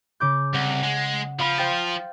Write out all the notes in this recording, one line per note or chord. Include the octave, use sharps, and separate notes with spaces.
C#3 D6 G6
C2 F#5
G#3
F3 F4 F5 B5
C5 G5 A6